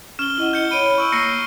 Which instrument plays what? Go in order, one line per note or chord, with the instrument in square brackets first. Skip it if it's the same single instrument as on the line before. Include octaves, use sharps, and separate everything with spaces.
[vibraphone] C#4 [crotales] F6 G7
[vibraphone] E4 D#5 F#5
[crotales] G6 C#7 G7
[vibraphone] C#5 B5 [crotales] D7 D#7 G7
[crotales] C#6 E6 D7
[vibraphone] A#3 [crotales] A#6 C7 C#7